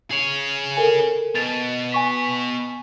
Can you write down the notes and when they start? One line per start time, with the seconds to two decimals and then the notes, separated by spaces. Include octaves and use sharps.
0.11 G#4 C#5
0.77 A4 A#4 G#5
1.35 B2 A6 F7
1.92 G#5 C#6 B6